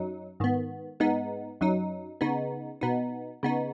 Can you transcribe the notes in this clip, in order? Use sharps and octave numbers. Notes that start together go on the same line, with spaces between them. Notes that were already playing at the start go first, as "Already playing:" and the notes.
Already playing: F#2 F#3 D#4
G#2 D#3 B3
G#2 G#3 B3 D#4
F#2 F#3 D#4
C#3 B3 D#4
B2 B3 D#4
C#3 B3 D#4